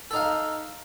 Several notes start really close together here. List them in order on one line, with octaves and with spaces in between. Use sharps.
A4 D#4 F5